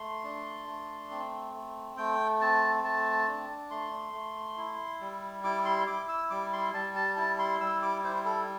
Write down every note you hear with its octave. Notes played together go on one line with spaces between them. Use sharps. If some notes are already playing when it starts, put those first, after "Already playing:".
Already playing: A3 C6
D4
A3
C4
A3
A3 G5
C4 A5
A3 A5
D4
A3 C6
A3
E4
G3
E4 D6
C6
E4 D6
E6
G3 D6
C6
G3 A5
A5
E4 A5
C6
G3 E6
D6
E4 C5
A4